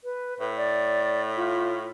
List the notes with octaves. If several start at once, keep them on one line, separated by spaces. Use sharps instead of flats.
B4
A2 B4
D5
F4